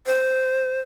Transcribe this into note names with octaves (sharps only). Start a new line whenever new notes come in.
C5